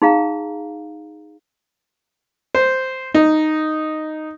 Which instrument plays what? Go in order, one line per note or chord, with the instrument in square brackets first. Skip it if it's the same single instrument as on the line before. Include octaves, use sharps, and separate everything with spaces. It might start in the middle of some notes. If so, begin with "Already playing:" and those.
[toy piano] D#4 G#4 F5 A#5
[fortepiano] C5
D#4